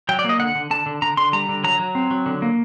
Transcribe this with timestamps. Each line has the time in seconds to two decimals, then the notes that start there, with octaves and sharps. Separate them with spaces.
0.09 F#3 G5
0.19 D5
0.24 A#3 D#5
0.39 D3 F#5
0.55 D3
0.71 D3 A5
0.86 D3
1.02 D3 A#5
1.17 D3 C6
1.33 G3 A#5
1.49 D3
1.64 F#3 A#5
1.80 F#3
1.95 C4
2.11 F#3
2.26 D3
2.42 A#3